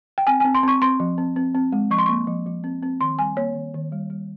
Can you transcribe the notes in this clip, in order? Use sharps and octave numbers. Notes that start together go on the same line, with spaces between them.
G5
C4 G#5
G#5
C4
C6
C4 C#6
C4 C6
F3
C4
C4
C4
G#3
F3 C#6
C6
A#3 C#6
F3
F3
C4
C4
D#3 C6
G3 G#5
A#3 C#5
D#3
D#3
G3
G3